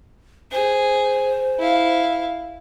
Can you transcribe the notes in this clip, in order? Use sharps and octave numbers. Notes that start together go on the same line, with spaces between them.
G#4 C5
E4 F5